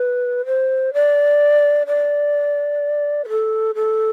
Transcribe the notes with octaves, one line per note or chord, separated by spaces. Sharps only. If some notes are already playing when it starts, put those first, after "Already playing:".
Already playing: B4
C5
D5
D5
B4
A4
A4